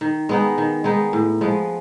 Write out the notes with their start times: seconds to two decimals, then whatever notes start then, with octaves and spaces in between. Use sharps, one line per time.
0.01 D#3
0.29 G#3 B3 D#4
0.58 D#3
0.84 G#3 B3 D#4
1.13 A2
1.41 F3 G#3 B3